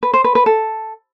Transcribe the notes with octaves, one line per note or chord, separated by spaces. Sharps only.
B4
C5
B4
B4
A4